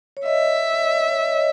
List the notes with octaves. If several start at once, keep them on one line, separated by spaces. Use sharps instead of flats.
C#5
D#5 E5
C#5
D#5